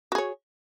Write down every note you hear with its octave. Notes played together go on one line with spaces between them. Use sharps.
F#4 G#4 C#5